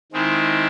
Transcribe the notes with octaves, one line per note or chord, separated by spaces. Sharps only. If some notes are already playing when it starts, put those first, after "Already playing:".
D#3 G#3 C4 E4